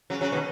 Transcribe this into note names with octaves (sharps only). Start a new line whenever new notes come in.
C#3 F#3
C#3 F#3
B2 D#3